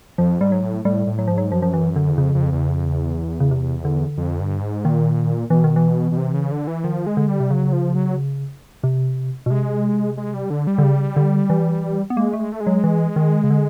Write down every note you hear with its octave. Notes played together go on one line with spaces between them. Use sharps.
F2 F3
G#2 G3
F#3
A2
A2 G3
A2
F#3
G#2 F3
F#3
F#2 F3
F3
E3
D3
E2
F2 C#3
F2
E2
F2
E2
C#3
C3
D3
F2
G2
G#2
A#2 D#3
B2 E3
D#3
E3
B2
C3
C#3
D3
E3
D#3 F3
G#3
D3
G3
C3
C#3 F#3
F3
F#3
C3
B2
C3 G#3
G#3
G3
D3
G3
D3
C#3
D3
E3
B3
G#3 A#3
A3
G#3
A3
G#3
F#3
E3
D#3
C#3
D3